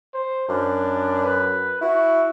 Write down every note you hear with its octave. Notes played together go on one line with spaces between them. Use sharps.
C5
F#2 D4
B4
E4 F#4